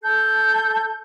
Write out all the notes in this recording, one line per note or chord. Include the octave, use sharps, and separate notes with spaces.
A4 G6